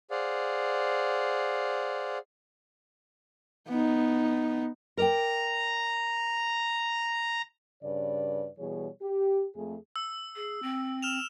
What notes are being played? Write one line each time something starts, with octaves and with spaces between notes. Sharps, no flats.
G#4 C5 D5 F5 F#5
B3 D#4
A#4 D5 G5 A#5
G2 C#3 B4 C#5 D5
B2 E3 G3 G#4 C#5
G4
F2 A3 G#4
E6
G#4
C4
F6 E7 F7